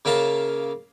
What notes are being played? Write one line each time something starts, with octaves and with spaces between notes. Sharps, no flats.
C#3 A#3 E5 F5 A5